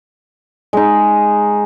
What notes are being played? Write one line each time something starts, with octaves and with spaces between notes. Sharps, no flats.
G#3 D#4